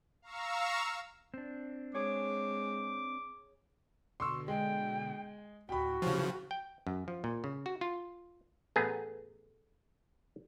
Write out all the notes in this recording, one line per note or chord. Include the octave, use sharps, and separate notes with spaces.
F5 A#5 C#6 E6
C4 D4
G#3 G#4 C#5 D6
B2 D3 C6 C#6 E6
G#3 G5
D2 A2 F#4 G5 B5
C#3 E3 F3 G4 C#5
G5
F#2
F3
A#2
C#3
F#4
F4
A1 A3 B3 G#4 G#5 A#5